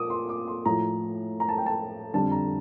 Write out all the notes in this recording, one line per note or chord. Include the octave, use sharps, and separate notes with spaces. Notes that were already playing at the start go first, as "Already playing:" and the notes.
Already playing: A#2 D6 D#6
C6
D6
C6
A2 F3 A#5
A#5
A5
G5
A5
F2 D3 G3 A5
A#5